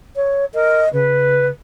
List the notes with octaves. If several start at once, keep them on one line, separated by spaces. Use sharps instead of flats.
C#5
A#4 D#5
C#3 B4